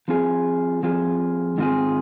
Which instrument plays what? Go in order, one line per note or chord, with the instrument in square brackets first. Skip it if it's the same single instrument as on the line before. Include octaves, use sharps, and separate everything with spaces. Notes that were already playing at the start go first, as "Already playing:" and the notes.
[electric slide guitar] F3 C4 F4 G#4
F3 C4 F4 G#4
G#2 D#3 C4 F4 G#4